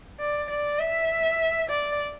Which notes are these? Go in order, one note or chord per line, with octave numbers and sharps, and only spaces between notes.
D5
D5
E5
D5